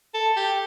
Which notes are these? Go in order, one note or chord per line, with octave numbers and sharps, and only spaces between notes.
A4
G4